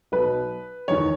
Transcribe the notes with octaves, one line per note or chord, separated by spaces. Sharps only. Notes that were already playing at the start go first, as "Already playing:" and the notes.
B1 B2 B4
F#1 E2 D#3 C#5